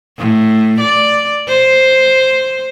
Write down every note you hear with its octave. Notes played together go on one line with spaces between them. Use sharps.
A2
D5
C5